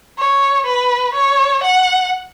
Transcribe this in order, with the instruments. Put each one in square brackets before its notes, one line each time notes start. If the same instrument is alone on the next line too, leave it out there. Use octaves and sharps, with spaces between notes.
[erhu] C#5
B4
C#5
F#5